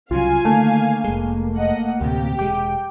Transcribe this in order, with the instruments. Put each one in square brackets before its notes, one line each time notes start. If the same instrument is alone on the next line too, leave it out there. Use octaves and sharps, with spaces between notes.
[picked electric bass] C2 C#3 F#3 [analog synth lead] F4 [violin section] F5 G#5
[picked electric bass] D3 D#3 [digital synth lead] A3 [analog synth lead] A#3
[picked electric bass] F1 G#3
[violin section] D#5 F#5
[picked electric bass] D2 A2 C3 [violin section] G4
[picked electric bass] E1 G#3 [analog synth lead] G5 [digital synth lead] D6